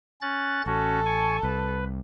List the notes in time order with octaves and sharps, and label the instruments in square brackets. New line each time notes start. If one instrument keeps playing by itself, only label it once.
[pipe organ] C#4 F#6 A6
[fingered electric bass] A1 [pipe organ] C#4 F#4 [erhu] A4
[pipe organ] G#5 C#6
[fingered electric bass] C2 [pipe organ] B4